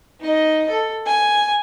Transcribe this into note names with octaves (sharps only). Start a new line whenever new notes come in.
D#4 D#5
A4
G#5